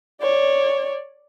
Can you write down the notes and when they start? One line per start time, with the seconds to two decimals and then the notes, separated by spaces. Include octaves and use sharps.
0.22 C#5 D5